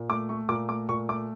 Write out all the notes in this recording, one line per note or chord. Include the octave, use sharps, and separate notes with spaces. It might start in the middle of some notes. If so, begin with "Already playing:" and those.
Already playing: A#2
A3 D6
A3 C#6
A#2 D6
A3 D6
A#2 C#6
A3 D6